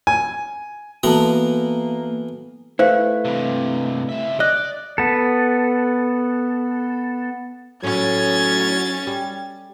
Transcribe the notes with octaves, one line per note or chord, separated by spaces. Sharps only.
G#5
E3 A#3 B3 F#4 A4 A5 A#5
A3 E4 B4 C5 F5
G2 C3
C#3 E5
D5 D#5 F#6
B3 A4
A2 F#3 C#4 G#6 A6
G3